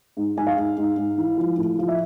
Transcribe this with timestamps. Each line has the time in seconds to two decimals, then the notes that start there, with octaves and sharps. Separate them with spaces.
0.17 G#2
0.37 G#2 G#5
0.47 F5
0.57 G#2
0.77 G#2
0.97 G#2
1.18 E3
1.37 F3
1.58 A2
1.79 F3
1.88 E5